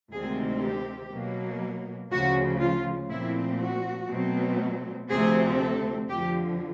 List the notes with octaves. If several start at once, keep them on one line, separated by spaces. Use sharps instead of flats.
D2 C3 D#3 G#3 C4 G#4
G4
B2 F#3 A#3
D2 C#3 F3 F#4
F4
A#2 F3 A3 C4 E4
F#4
B2 F#3 A3 C4
D2 C3 F3 A3 C4 G#4
A4
F2 D3 F3 G4